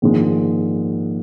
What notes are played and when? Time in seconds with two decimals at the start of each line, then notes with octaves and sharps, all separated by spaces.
0.02 A#1 G#2 D#3 G#3